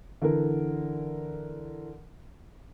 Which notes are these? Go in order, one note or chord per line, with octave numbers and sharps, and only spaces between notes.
D3 E3 A#4